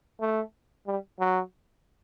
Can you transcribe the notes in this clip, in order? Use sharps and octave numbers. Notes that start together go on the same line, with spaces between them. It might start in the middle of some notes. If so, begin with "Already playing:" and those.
A3
G3
F#3